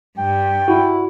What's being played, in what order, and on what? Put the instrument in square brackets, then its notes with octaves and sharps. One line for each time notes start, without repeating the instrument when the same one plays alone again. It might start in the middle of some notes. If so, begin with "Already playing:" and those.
[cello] G2 [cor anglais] G5
[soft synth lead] E4 [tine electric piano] F#4